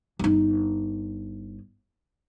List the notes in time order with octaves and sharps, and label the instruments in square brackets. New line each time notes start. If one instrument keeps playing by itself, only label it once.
[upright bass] G1 D#4